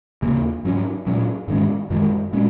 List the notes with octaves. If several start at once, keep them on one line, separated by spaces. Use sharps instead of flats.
D#2 C#3 A#3
G#2 F#3 C#4
A#2 F#3 C#4
G#2 D#3 G#3 C#4
F#2 D#3 G#3
A#2 G#3 C#4